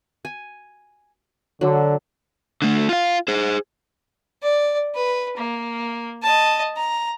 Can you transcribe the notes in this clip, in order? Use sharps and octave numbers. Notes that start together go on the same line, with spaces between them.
G#5
D3 F#3
D3 A3
F4 F5
G#4 C5
D5
B4
A#3
D#5 A5
A#5